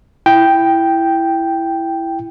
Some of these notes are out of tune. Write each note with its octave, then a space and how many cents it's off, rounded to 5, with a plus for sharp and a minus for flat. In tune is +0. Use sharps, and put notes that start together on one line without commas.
E4 +10 G5 +0